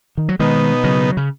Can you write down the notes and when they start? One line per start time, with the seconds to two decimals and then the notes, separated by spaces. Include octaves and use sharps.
0.17 D#3
0.29 F#3
0.40 B2 D#3 G#3 B3 D#4
0.84 C#3 F#3
1.17 C#3